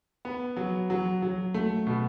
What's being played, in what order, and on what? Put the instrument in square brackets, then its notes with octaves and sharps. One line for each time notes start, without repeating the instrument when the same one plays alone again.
[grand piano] B3
F#3
F#3
F#3
A3
B2